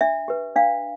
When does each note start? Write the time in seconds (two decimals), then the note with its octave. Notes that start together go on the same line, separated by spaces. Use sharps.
0.01 D4 E5
0.28 G4 B4
0.56 D4 F5